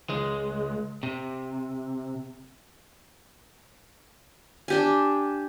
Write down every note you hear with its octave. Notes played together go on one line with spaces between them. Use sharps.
C#2 G#3
C3
D4 G4 G#5